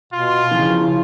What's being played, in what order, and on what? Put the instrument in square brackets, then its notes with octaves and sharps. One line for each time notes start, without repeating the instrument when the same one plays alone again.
[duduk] B2 [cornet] F4
[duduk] C#3 [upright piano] E3 F3